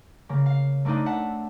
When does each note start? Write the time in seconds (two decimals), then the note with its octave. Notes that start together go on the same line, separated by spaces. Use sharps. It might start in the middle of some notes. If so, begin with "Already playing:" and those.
0.29 C#3 A#3
0.46 F5
0.85 A3 A#3 C4 D4 D#4
1.06 E5 F#5 A5